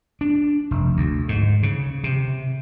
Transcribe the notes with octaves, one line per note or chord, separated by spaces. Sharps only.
D4
F1
D2
G#2
C#3
C3